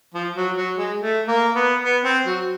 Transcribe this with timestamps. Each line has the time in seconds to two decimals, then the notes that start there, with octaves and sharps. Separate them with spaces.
0.14 F3
0.36 F#3
0.56 F#3
0.78 G#3
0.99 A3
1.27 A#3
1.55 B3
1.83 B3
2.04 C4
2.25 F#3